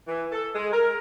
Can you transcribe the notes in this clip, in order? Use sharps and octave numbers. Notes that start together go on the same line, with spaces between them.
E3
A4
G#3
A#4